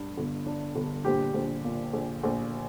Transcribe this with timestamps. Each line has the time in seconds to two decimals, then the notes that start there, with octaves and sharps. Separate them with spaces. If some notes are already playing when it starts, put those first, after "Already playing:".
Already playing: G2
0.17 G1
0.46 D4
0.75 G1
1.05 A#1 G4
1.34 A#1
1.65 A#2
1.93 A#1
2.23 A#1